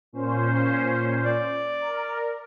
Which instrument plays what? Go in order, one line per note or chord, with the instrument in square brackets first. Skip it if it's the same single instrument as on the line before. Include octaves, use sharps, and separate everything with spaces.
[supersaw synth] A#2 C#4 C5
[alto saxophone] D5
[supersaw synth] A#4